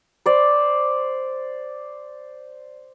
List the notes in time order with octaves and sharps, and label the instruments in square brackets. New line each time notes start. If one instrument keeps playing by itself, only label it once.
[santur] C5 D5